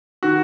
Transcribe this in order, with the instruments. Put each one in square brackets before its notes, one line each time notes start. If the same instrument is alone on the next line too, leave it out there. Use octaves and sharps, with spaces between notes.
[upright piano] D#3 [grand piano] F#4